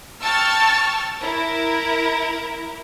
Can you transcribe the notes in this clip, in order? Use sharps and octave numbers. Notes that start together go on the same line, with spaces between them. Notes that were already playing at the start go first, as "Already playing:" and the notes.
G5 A5 C#6 E6 F6 A6
E4 A#4